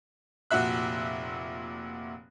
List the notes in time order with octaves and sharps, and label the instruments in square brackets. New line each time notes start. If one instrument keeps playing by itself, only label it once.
[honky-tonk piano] F1 A#2 F#4 E5 F#6